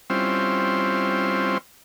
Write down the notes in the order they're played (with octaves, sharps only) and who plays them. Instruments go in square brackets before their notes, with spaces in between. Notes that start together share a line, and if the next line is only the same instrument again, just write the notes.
[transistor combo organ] G3 C4 C#4 E4 F4 C5